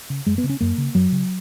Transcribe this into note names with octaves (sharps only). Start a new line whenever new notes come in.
C#3
F#2 G#3
B3
C#3
C#4
F#2 A#3
C#3
F#2 F#3
C#3